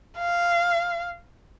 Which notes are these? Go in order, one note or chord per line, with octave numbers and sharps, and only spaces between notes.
F5